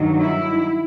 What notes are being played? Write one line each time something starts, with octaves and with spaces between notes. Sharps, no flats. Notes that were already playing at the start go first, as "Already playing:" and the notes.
Already playing: G2 D#3 F#3
E4